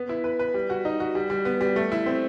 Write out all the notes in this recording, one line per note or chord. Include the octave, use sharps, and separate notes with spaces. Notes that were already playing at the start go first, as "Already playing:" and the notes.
Already playing: B3
E4
B4
B4
G3
F#4
D#4
F#4
G3
G3
B3
G3
A3
E4
C4